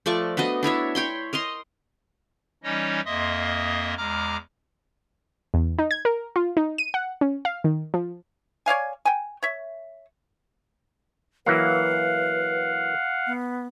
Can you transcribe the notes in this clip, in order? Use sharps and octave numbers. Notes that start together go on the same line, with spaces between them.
F3 A3 D5 C#6
B3 D4 F#4 D#5
D4 E4 C#5 E5
C#5 G5 B5 C6
A#4 D#5 A#5 C6
E3 G3 C#4 D#4 C#5 D#5
F2 A#3 D#5 E5 C6 D#6
E2 G#3 A#5 D6 F6
E2
D#4
G#6
A#4
F4
D#4
D#7
F#5
C#4
F5
D#3
F3
C#5 D5 F5 G#5
G5 G#5
C#5 E5
E3 F#3 A#3 B4 F5 F#5
B3